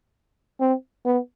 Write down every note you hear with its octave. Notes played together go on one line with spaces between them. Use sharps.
C4
B3